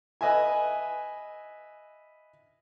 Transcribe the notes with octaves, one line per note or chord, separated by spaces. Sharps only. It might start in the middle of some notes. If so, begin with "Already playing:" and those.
B4 D#5 E5 G#5